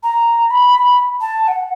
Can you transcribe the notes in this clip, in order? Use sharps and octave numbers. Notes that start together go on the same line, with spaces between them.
A#5
B5
A5
A5
F#5